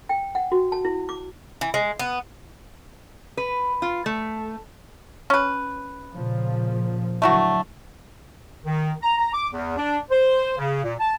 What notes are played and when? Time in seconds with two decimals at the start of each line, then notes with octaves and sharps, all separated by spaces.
0.09 G5
0.35 F#5
0.52 F#4
0.72 A5
0.85 E4
1.09 D6
1.61 E3
1.74 G#3
1.99 B3
3.37 B4
3.82 F4
4.06 A3
5.30 C#4 B4
6.13 A#2 C#3 F3
7.22 D3 F#3 A3 E4 F#4
8.65 D#3
9.03 A#5
9.18 A#5
9.33 D6
9.52 E2
9.77 D4
10.11 C5
10.58 C#3
10.84 A#2
11.00 A5